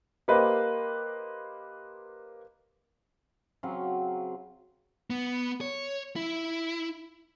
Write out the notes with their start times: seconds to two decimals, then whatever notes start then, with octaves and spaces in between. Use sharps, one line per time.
0.28 A#3 G4 B4 C5 D#5
3.63 C#3 F#3 C4 F5
5.10 B3
5.61 C#5
6.16 E4